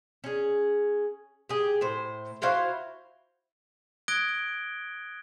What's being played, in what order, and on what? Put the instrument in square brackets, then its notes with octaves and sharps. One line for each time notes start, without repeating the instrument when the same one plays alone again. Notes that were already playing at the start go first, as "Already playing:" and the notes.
[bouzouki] C#4 G#4
G4 G#4
A2 C5
E4 F#4 C5 F5
[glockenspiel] D#6 F#6 G#6 A#6 D7 G7